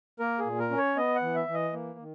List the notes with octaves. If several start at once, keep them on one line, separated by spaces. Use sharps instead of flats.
A#3 A#4
G#4
A#2
A#4
C#4
C#5
B3 D#5
F#5
E3
E5
E3
D#5
A#3
D#3